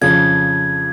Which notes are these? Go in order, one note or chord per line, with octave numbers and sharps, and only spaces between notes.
F2 C#3 F3 G#6